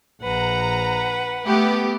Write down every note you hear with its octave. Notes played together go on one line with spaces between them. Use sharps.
A#1 B4 F#5 A#5
A3 B3 G4